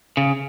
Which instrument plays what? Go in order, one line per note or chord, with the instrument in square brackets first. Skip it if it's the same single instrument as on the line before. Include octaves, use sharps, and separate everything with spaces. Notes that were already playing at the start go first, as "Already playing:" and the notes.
[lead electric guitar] C#3